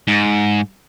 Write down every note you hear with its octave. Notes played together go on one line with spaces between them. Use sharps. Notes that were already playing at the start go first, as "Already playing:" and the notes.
G#2